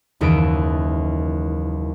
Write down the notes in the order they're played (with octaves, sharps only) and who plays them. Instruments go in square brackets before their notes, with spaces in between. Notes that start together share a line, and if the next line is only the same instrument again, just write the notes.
[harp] F#1 D#2 E3 D#5 E5 D7